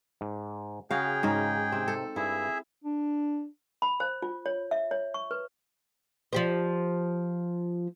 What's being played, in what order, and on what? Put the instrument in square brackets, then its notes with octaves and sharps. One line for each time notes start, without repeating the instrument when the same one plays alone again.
[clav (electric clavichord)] G#2
[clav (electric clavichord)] C#3 [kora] F#4 F5 [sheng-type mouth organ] G#4 G5
[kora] G#2 C#4 D#4
[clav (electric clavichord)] C3 [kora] C4
[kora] A4
[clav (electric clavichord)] G2 [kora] E4 [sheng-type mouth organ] G#4 E5
[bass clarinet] D4
[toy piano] B5
C5
F4
C#5
E5
C#5
C#6
B4
[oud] F3 G4 C5